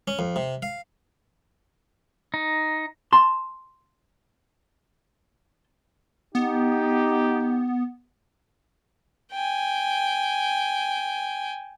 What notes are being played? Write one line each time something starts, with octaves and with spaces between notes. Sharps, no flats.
C#4
F2
C3
F5
D#4
A5 C6
B3 D#4 G4
G5 G#5